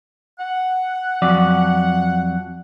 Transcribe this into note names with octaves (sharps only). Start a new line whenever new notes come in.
F#5
F2 F#3 D5